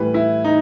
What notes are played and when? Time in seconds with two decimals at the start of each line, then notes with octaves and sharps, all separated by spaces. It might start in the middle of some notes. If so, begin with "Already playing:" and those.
Already playing: A2 E3 G3 B4
0.14 E4
0.44 D#4